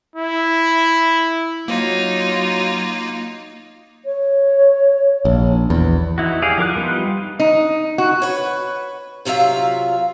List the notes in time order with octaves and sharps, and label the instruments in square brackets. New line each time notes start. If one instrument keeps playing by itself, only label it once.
[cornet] E4
[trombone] F#3 [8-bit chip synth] A#3 [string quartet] D#4 F4
[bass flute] C#5
[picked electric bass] A#1
E2
[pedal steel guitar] D#4 E4 F#4
G4 G#4 D5 F5
F3 A#4 D6 F#6
G3 B3 D#4 F4
[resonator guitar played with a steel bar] D#4
F#4
[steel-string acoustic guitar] B4 C#5
C3 F#3 F4 E5 F5